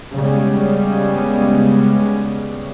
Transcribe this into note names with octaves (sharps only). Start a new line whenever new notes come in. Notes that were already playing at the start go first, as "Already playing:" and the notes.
C#3 G3 G#3 B3